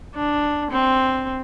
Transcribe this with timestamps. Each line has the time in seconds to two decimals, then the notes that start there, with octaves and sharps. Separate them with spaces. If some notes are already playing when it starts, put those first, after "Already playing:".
0.15 D4
0.70 C4